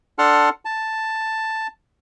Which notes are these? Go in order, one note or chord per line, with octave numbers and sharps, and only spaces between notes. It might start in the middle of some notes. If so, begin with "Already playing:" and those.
D4 A4 F#5 A5 C6 F6
A5